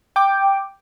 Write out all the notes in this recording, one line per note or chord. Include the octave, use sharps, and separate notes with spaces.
G5 D6